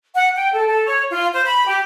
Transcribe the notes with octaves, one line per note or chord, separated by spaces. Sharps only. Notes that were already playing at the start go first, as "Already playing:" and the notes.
F#5
G5
A4
A4
C#5
F4
C5
B5
G4